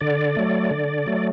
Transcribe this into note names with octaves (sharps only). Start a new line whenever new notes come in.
D3 D5
F#3 A3
D3
F#3 A3